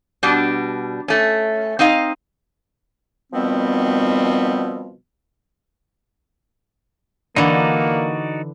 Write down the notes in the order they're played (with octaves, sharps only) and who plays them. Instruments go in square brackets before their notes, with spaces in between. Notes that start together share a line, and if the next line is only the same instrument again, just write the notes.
[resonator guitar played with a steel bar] B2 G3 D4
A3 C#4
C4 D#4 D#5 F5
[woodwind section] B2 D#3 F3 G3 B3 C4
[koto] D3 E3 [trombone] A#3 [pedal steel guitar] D#4 F#4 D5